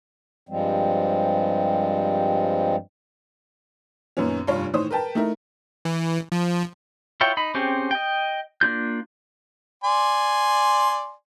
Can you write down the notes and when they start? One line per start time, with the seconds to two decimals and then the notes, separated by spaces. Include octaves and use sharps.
0.49 G2 F3 G3 G#3 C4
4.17 F#2 A#2 D#3 B3 C#4
4.47 F1 G2 F4 C#5
4.73 A2 D#3 E3 C5 C#5 D#6
4.91 A#4 B4 G5 A5
5.15 A3 D#4 E4 A#4
5.85 E3
6.32 F3
7.21 E4 F4 C#5 G5
7.37 D#4 B5
7.54 C4 C#4 G4 G#4 C5
7.91 D#5 G5
8.61 A#3 D4 F4 G6
9.84 D5 G#5 C6